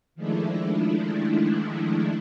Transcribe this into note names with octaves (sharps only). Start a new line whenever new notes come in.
D#3 F3 G#3 A3 D4 E4